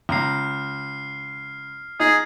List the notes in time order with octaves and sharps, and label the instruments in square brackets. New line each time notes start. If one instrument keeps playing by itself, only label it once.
[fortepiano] C#2 A#5 [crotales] F6 C7
[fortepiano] D#4 [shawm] G#4